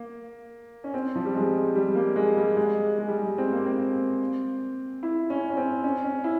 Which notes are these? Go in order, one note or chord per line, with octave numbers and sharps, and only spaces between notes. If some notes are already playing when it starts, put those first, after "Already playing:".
Already playing: A#3
C#4
C4
F3
G3
G#3
G3
A#3
G#3
G3
G#3
G#3
G3
G#3
C4
A#3
C4
E4
C#4
C#4
C4
C#4
C#4
E4